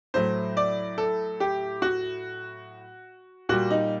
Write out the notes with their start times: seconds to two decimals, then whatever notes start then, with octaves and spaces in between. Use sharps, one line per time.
0.14 A2 F#3 A3 C5
0.57 D5
0.98 A4
1.40 G4
1.82 F#4
3.49 A#2 G3 F#4
3.71 D#4